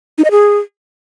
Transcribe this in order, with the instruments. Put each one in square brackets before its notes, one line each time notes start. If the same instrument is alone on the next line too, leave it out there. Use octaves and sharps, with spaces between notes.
[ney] D#4
D#5
G#4